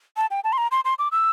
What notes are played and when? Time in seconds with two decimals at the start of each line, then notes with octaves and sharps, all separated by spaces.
0.17 A5
0.31 G5
0.44 A5
0.53 C6
0.58 A#5
0.71 C6
0.85 C6
0.99 D6
1.12 E6